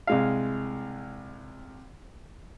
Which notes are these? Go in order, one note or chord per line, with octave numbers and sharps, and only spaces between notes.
C2 G#3 F5